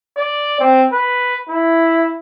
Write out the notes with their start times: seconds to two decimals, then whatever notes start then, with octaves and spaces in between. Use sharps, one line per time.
0.17 D5
0.60 C4
0.92 B4
1.49 E4